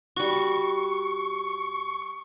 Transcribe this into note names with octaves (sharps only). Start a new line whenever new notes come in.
G3 F#4 C#6